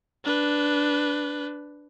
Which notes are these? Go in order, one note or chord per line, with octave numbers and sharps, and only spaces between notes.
D4 B4